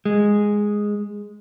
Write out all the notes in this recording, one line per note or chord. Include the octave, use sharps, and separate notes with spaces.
G#3